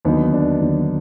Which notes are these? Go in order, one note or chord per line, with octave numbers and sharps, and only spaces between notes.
D#2 D3 F#3 B3 D#4
D4
D#2 D3 F#3